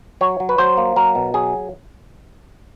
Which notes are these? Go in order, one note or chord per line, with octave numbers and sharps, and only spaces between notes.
F#3 C#5
F#3
B4
F#3 C5
A#3
F#3 A#4
B2
F#3 G#4